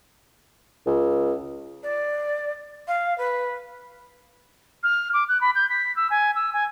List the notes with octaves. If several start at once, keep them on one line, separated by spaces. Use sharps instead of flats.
C#2
D5
F5
B4
F6
D6
F#6
B5
G6
B6
E6
G#5
E6
G#5